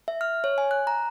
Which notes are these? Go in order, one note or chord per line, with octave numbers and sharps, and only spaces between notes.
E5
F6
C#5
G#5
F#6
A#5